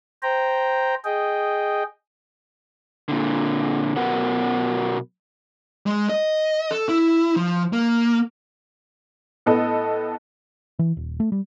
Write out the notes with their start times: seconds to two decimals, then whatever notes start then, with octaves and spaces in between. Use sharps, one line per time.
0.23 C5 G5 A#5
1.05 G#4 D#5 G5
3.08 A#2 D3
3.96 B2 F#3 B3 A#4 F#5
5.86 G#3
6.09 D#5
6.71 A4
6.89 E4
7.36 F3
7.73 A#3
9.46 A2 B3 A4 D#5
10.79 E3
10.97 D#1
11.20 A3
11.32 G3